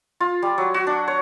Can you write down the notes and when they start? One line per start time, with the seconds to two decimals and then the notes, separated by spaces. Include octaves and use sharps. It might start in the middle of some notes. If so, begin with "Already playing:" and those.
0.20 F4
0.42 G3
0.58 F#3
0.74 F#4
0.87 D4
1.08 C#5